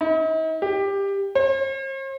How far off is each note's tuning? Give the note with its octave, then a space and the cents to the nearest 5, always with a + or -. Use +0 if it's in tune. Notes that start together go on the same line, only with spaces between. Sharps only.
D#4 +45
G4 +15
C5 +45